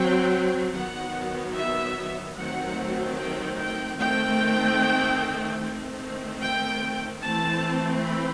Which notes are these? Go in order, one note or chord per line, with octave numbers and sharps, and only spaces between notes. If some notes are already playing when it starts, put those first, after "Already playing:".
Already playing: F#3 C4 G5
D#3 F#3 B3 F#5
E5
D#3 F#3 A3 C4 F#5
G5
G5
D#3 A3 C4 G5
D#3 A3 C4
G5
E3 A3 C4 A5
B5